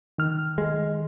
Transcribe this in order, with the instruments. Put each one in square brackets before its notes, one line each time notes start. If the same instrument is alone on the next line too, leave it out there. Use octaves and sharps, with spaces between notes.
[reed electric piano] D#3 F6
[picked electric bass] G#3